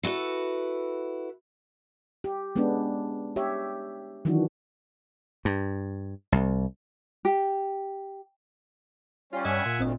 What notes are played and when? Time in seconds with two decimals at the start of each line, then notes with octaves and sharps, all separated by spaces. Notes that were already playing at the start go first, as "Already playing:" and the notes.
0.03 E4 F#4 A4 B4
2.24 G4
2.56 G#3 B3 C#4 D4
3.36 G4 C#5 E5
4.25 D#3 E3 F#3 D4 F#4
5.45 G2
6.32 C2
7.25 G4
9.33 G3 C#4 F4
9.45 G2 D#5 E5 F#5 G#5
9.66 A#2 C6
9.79 G#1 D2 C4 D#5